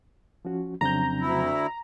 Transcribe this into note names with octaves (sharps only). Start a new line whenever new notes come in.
F3 C#4 F#4
F2 C#3 F#3 C4 D4 A#5 G6
D2 E4